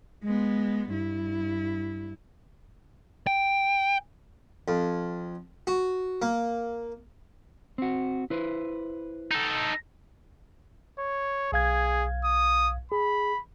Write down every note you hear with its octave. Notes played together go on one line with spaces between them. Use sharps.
G#3 B3
G2 E4
G5
F2
F#4
A#3
C4 F#4
E4 B4 C5
D#4 A4
C#5
B1 G#4 F5 G#6
D#6
G#4 B5